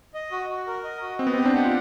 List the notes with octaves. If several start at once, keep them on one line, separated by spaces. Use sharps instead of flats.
D#5
F#4
F#4
A#4
D#5
F#4
C4 D#5
B3
C4
G4
C4 D4
F#5
F4